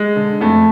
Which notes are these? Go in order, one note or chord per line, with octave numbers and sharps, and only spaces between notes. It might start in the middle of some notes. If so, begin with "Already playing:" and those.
Already playing: G#3
D3
F2 A3